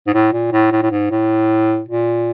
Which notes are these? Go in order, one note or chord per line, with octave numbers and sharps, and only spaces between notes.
G#2
A2
A#2
A2
A2
A2
G#2
A2
A#2